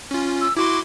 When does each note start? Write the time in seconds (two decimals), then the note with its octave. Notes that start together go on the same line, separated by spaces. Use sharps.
0.11 C#4 F4
0.41 E6
0.57 E4 F#4 C6 D6